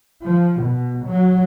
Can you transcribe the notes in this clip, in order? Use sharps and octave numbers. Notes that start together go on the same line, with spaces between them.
F3
B2
F#3